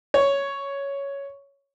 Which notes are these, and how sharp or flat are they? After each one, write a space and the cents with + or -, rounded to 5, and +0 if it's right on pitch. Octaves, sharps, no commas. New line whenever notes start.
C#5 +5